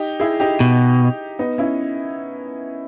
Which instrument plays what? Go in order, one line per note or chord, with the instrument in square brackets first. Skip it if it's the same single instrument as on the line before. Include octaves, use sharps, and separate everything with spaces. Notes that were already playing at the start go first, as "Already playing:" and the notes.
Already playing: [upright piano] D#4 G4
E4 G#4
D#4 G4
[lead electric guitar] B2
[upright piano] B3 D#4
C#4 E4